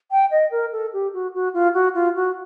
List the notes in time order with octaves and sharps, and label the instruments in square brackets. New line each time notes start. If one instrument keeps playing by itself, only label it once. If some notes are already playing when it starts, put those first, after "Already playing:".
[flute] G5
D#5
A#4
A4
G4
F#4
F#4
F4
F#4
F4
F#4